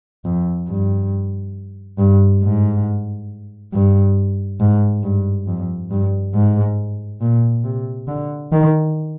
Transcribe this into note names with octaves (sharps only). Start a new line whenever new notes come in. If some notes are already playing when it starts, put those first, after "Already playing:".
F2
G2
G2
G#2
G2
G#2
G2
F2
G2
G#2
A#2
C3
D3
D#3